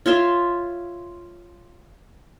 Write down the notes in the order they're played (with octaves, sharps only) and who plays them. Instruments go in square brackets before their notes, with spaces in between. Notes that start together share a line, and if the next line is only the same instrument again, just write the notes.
[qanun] F4 C#5 E5 C6